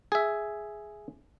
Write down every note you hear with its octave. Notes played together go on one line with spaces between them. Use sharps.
G#4 E5